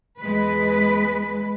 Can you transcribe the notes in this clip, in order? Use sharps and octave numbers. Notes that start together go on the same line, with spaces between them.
E2 G#3 B4